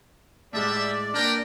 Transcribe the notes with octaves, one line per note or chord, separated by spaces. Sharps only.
A2 G3 G#3 D5 E5
A#3 D4 A#4 B4 G5